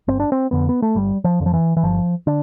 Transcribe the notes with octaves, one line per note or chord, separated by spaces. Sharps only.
G1 C4
D4
C4
F2 D3 B3
B3
A3
G1 G3
F3
F2 D3
F3
E3
E3
G1 F3
D3 D4